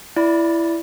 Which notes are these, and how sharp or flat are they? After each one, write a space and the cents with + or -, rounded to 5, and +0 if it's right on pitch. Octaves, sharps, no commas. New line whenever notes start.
E4 +15 D5 -5 B5 -15